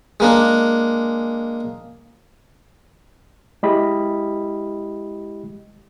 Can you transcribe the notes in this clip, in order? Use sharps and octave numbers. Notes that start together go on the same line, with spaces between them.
G#3 A#3 D4
G#3 E4 G4 D#5 B5